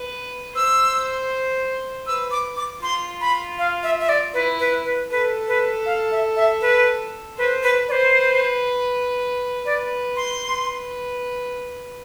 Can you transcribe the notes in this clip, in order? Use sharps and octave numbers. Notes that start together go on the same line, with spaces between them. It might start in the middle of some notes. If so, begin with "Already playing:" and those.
Already playing: B4
C5 E6
B4 E6
D6
D6
F4 C6
B5
F5
E5
E5
D5
E4 B4
B4
B4
A4 B4
B4
F5
E5
E5
B4
B4 C5
B4
B4
D5
C5
B4 D5
C6
B4